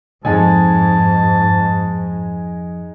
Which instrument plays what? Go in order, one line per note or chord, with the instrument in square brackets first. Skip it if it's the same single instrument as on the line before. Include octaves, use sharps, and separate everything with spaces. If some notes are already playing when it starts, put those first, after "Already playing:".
[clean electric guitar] C2 F2 [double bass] G#2 [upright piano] G#3 D#4 G#5 [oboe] A5